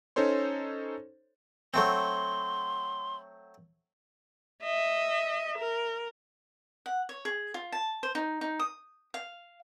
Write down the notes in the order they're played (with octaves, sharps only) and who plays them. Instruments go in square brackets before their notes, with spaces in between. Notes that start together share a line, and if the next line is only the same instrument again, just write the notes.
[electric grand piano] C#4 D#4 A4 C5 C#5 C6
[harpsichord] F#3 A3 C4 [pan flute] C6
[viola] D#5 E5
A#4
[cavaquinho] F#5
C#5
G#4
F4
A5
C5
D#4
D#4
D#6
F5